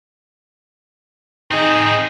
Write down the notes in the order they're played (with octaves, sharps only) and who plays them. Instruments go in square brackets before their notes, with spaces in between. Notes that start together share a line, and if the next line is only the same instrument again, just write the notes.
[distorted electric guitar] C4 G#4 [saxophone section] D#4